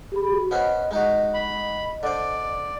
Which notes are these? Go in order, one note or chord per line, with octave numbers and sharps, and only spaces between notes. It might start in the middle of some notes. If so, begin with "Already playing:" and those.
G4 G#4 B5
F#4
B3 C#4 C5 D#5
G#3 D#4 F#4
B5
D3 C5 D5